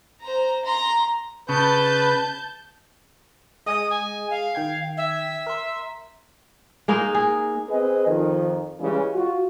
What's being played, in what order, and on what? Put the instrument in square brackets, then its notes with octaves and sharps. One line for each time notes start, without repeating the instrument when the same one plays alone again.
[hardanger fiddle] C5 A#5
A#5 C6
[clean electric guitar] C#3 [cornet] B4 [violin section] A5 G6
[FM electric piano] G#3 G#4 D#5 [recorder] D#6
[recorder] G#5
F5
[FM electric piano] D#3 G5 G#6
[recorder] E5
[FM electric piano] A#4 C6
[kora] G#3 A#3 D#4 G#4
G#4
[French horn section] C4 G#4 B4 D#5
F2 D#3
C#3 E3 G3 G#3 C#4
F4 F#4